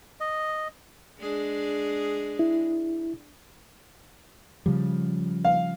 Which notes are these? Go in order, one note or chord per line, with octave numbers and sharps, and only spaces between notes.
D#5
G#3 D4 G#4
E4
C#3 F3 G3
F5